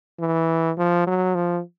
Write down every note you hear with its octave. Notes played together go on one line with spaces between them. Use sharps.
E3
F3
F#3
F3